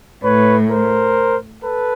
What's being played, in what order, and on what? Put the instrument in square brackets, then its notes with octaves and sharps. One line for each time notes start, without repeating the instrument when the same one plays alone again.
[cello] A2 [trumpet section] B4 C#5
[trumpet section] A#4 C5
A4 B4